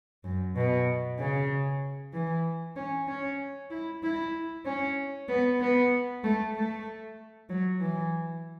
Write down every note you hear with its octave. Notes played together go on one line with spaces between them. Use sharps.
F#2
B2
C#3
E3
C#4
C#4
E4
E4
C#4
B3
B3
A3
A3
F#3
E3